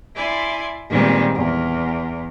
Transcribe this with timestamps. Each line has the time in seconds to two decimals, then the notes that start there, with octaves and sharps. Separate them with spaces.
0.15 E4 D5 G#5 C6
0.88 A#2 D#3 G3 G#3 B3 C4
1.32 E2